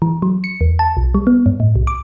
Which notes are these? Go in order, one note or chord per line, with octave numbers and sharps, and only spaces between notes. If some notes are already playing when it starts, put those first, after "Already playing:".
E3
F#3
C#7
E2
A5
B1
G3
B3
G2
A2
C2
D6